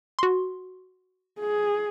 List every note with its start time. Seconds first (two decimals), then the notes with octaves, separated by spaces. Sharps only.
0.19 F#4 C6
1.41 G#4